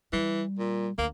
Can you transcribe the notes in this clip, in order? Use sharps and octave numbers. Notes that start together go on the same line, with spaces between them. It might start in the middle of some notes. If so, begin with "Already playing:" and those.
E3 G3
A#2
D2 A#3